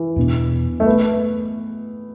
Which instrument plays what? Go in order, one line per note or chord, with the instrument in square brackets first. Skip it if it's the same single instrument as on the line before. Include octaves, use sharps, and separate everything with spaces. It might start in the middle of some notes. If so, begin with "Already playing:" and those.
Already playing: [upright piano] E3
[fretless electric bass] E2 B2 B3 D4
[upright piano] A3
B3